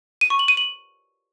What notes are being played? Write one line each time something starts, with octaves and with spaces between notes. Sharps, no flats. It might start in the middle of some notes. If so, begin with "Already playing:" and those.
D#7
C#6
F#7
D#7
F#7